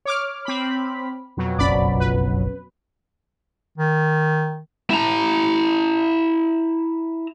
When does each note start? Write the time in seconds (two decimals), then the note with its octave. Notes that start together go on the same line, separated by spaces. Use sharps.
0.05 C#5 D6 F6
0.45 C4 B5
1.37 F2 B2 F#3
1.59 F#1 B1 C#4 D5 B5
2.00 B4
3.78 D#3
4.90 E4 A#5